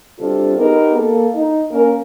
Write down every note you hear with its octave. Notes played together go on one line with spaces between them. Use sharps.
C3 G3 D4 F4 A4
B3 D#4 G4 G#4 A#4
A#3 A4
D#4
A#3 C#4 A#4